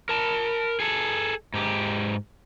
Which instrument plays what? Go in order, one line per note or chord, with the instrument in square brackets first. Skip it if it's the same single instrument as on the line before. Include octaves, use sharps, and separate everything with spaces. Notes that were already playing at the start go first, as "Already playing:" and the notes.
[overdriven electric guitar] A#4 A5
G#4 A4
G#2 G4